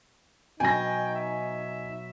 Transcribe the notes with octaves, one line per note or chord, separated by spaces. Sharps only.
B2 F#3 D#4 G5 G#5 A#6
E5